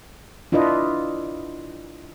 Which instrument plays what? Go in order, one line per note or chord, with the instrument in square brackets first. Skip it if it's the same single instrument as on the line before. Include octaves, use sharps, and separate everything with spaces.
[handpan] D4 E4 F4 B4 D#5